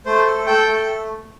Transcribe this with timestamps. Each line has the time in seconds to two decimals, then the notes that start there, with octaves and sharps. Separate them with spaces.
0.06 A3 C5
0.26 A4
0.47 A4 G5
0.67 A3